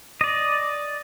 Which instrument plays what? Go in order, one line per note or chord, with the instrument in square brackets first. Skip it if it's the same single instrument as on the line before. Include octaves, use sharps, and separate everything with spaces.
[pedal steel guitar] D5 D#5